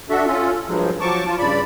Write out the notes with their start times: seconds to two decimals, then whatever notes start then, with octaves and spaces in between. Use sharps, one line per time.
0.10 D4 F#4 A4 E5
0.26 C#4 F4 A4
0.67 G2 F3 F#3 G#3
1.00 F3 F#3 A5 C#6 D6
1.27 F4 A5
1.39 G2 C#3 D5 B5